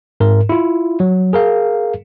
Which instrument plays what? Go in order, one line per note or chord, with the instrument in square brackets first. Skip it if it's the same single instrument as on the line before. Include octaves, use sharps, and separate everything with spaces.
[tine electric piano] G#2 A#4
E4 F4
F#3
G#4 A#4 F5